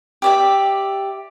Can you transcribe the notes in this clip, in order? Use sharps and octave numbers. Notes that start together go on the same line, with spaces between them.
G4 D5 E5